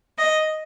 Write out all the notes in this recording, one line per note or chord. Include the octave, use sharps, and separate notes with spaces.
D#5